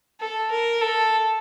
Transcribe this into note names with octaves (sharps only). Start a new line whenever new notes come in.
A4
A#4
A4